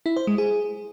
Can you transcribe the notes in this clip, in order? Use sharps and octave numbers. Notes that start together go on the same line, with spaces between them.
E4
C5
G#3
G#4